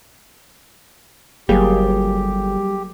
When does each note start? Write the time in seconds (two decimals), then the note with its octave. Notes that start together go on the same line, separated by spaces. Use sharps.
1.49 G1 F#3 G3 A#3 G4 G#4